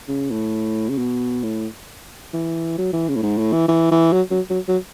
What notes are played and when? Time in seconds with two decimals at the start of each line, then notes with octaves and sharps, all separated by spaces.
0.08 C#3
0.31 A2
0.90 C#3
0.98 B2
1.43 A2
2.34 E3
2.78 F#3
2.93 E3
3.09 C#3
3.16 A2
3.23 G#2
3.38 A2
3.53 E3
3.68 E3
3.91 E3
4.13 F#3
4.31 F#3
4.50 F#3
4.68 F#3